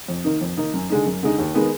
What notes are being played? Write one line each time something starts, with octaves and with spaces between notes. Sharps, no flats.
F2
D#3 A#3 D#4
F2
D#3 A#3 D#4
F#2
D3 G#3 D#4
F#2
D3 G#3 D#4
D#2
D#3 G#3 B3 D#4